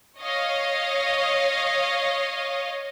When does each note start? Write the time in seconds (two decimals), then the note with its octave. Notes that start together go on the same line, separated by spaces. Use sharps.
0.19 C#5 D#5 F5